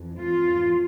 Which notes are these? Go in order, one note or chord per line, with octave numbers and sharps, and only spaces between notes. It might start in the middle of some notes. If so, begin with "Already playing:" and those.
Already playing: F2 E3
F4